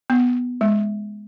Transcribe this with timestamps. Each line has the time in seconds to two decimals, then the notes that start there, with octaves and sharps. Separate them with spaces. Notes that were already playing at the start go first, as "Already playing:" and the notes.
0.10 B3
0.61 G#3